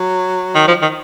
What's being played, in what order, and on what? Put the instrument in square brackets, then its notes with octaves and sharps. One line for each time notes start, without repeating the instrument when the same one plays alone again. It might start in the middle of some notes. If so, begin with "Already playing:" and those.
Already playing: [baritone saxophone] F#3
[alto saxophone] D#3
F3
D#3